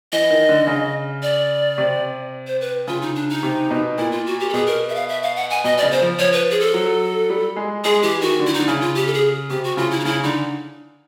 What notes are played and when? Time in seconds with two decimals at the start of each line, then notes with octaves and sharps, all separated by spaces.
0.12 E3 D#5
0.31 D#3
0.49 D3
0.67 C#3
1.23 D5
1.78 C3
2.47 C5
2.61 B4
2.87 C#3 F4
3.02 D#4
3.15 D4
3.30 D#4
3.43 C3
3.70 B2
3.98 A#2 E4
4.12 F4
4.26 F#4
4.40 G4
4.49 A4
4.53 B2 G#4
4.67 A#4
4.89 E5
4.95 F5
5.09 E5
5.23 F5
5.36 F#5
5.50 G#5
5.64 B2 D#5
5.78 D5
5.82 C#3
5.91 C5
6.01 F3
6.19 F3 C#5
6.33 B4
6.51 G#4
6.60 A4
6.74 F#3
7.30 G3
7.56 G#3
7.84 G#3 G#4
8.03 E3 G4
8.21 D#3 F#4
8.39 D3
8.47 E4
8.54 D#4
8.59 D3
8.68 C#3 E4
8.81 F4
8.95 G4
9.07 A4
9.14 G#4
9.50 C3 G4
9.64 F#4
9.77 C#3 F4
9.91 E4
10.00 D#4
10.05 C#3 E4
10.24 D3 D#4